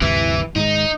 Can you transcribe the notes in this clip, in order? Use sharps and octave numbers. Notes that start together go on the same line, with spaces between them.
D2 G2 C3 E3 E4
G#2 D#3 G#3 D#4